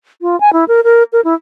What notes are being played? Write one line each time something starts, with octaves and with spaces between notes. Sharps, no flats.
F4
G#5
E4
A#4
A#4
A#4
E4